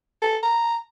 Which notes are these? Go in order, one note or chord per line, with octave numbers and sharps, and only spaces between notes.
A4
A#5